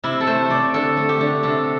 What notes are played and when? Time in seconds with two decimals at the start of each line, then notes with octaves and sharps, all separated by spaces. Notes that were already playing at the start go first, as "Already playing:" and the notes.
0.03 C3 E4
0.21 A4
0.27 A3 C5
0.50 C3 D5
0.74 D3 A4
0.97 A3
1.09 G4
1.21 D3
1.43 C3 A4